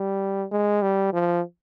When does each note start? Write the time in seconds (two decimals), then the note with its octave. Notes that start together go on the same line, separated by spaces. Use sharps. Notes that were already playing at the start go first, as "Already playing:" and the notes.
Already playing: G3
0.52 G#3
0.82 G3
1.14 F3